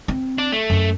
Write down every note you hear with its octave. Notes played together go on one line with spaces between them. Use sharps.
C4
D4
A3
F#2